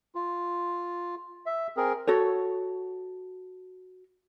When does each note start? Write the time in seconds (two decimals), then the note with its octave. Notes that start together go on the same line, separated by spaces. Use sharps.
0.15 F4
1.46 E5
1.77 C4 G#4 A#4
2.07 F#4 A4 C#5